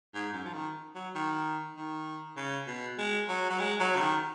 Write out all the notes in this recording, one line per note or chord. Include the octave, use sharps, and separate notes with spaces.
G#2
F#2
F3
D#3
F#3
D#3
D#3
C#3
B2
G#3
F#3
F#3
G#3
F#3
C#3
D#3